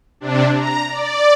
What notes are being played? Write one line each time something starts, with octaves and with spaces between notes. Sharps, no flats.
C3 D4
A#5
D5